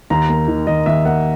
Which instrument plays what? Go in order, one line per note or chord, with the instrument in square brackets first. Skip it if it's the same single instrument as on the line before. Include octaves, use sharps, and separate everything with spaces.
[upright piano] D#2 A#5
A#3
D#3
D#2 D#5
D#2 E5
A#3 F#5